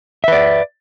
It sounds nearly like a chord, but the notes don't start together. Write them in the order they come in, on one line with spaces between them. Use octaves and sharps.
E5 B4 D5